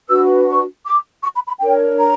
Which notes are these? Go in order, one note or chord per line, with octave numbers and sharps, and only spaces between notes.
D4 F#4 B4 E6
C#6
D6
C#6
B5
B5
D4 A#4 C#5 G5
A#5